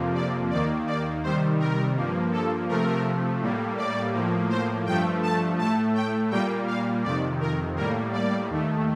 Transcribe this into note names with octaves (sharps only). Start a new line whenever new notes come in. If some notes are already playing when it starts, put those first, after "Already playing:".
Already playing: F2 C3 F3 A#3
D5
D#2 D#3 A#3 D5
D5
C3 D#3 G3 C5
A#4
G2 F3 A#3
A4
C3 F3 A3 A#4
A2 G3 A#3
D5
A2 F3 A#3
C5
G2 F3 A3 G5
A5
A2 A3 A5
G5
A#2 G3 A#3 G5
F5
F2 C3 D#3 D5
A#4
A2 G3 A#3 A#4
D5
D#2 D#3 A3